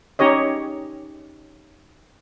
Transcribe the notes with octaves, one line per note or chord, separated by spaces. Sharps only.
C#4 D#4 G4 C#5 D#5